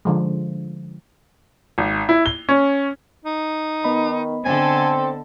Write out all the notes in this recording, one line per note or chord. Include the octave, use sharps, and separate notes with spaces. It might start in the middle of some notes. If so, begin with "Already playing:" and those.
D3 F3 G#3
G#1
E4
G7
C#4
D#4
D#3 B3 D#5 B5
D3 C4 A4 G#5